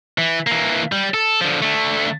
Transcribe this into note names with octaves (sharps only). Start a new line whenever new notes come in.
E3
E3 A#3
G3
A4
D3 F3
D3 A3